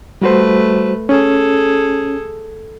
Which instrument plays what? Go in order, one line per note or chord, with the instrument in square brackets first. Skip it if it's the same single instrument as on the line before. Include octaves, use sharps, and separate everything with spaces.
[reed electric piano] G3 F#4 C5 [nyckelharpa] A3 B4
[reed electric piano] C#4 [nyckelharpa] G#4 A4